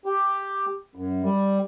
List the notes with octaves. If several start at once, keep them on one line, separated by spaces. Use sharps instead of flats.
G4
F#2
G3